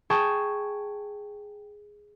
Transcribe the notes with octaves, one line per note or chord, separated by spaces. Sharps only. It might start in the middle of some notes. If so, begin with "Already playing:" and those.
G#4 G5 A5 C#6